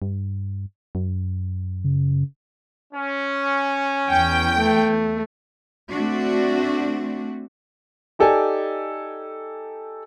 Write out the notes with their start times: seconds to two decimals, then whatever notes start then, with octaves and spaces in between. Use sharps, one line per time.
0.02 G2
0.95 F#2
1.84 C#3
2.93 C#4
4.08 E2 G5
4.58 A3
5.91 A3 C4 D4 F#4
8.19 D#4 G4 A4 D5 G#5